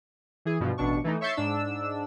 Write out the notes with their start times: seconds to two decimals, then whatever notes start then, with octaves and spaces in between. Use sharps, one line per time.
0.45 E3 G#4
0.60 G2 B2 F3
0.78 A1 B2 D4 C#6
1.04 E3 A3 D#4
1.21 C#5 E5 C#6 G6 A6 C7
1.36 G#2 D4 E6